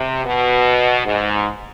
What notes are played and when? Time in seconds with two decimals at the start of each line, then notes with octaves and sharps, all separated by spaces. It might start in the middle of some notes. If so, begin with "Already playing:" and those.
Already playing: C3
0.25 B2
1.05 G#2